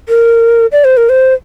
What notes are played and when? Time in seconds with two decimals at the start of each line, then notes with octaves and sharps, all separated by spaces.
0.09 A#4
0.72 D5
0.84 C5
0.97 A#4
1.09 C5